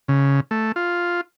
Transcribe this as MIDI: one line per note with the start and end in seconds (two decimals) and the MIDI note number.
0.08 0.40 49
0.51 0.72 57
0.76 1.21 65